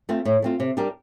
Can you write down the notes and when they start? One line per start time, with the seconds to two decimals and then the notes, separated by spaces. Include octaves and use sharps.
0.09 A3 C4 F4
0.25 A2
0.42 A3 C4 F4
0.60 C3
0.77 G3 D4 G4 A#4